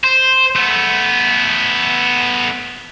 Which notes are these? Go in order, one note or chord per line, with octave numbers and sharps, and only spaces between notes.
C5
A3 B3